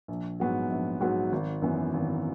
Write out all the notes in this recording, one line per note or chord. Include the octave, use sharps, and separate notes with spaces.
A#1
G#2 F#3 B3 F#4
A#1
G#2 F#3 B3 F#4
G#1
F#2 E3 B3
G#1